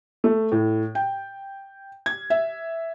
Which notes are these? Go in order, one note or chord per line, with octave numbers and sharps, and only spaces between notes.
A3
A2
G5
G#6
E5